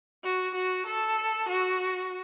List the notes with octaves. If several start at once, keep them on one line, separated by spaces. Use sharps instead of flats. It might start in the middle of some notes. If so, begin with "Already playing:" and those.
F#4
F#4
A4
F#4